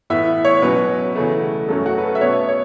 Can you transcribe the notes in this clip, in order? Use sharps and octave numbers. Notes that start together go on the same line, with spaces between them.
A2 E3 B3 E5
C#5
B2 F#3 C#4 B4
E2 C#3 A3
F#2 F#3 A3 C#4 A4
F#4
B4
A4
E5
B2 B3 C#5
C#5